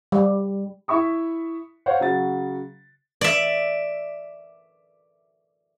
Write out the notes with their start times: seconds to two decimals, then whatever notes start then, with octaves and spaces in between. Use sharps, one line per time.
0.12 G3
0.88 E4 E5 B5 C#6 D#6
1.86 C5 C#5 F5 F#5
2.00 C#3 F#3 F#4 A6
3.21 D5 E5